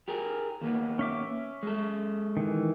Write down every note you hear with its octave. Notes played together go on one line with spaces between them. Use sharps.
G4 G#4 A#4
D#2 A#3 B3
C#4 E5 D6
G#3 A4
D#3 E3